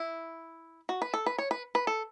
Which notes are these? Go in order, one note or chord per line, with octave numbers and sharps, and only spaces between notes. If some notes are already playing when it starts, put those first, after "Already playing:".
Already playing: E4
F#4
B4
A4
B4
C#5
B4
B4
A4